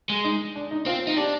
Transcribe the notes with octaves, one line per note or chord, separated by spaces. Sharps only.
G#3
D#4
D4
D#4
C4 F4
D#4
D4 G4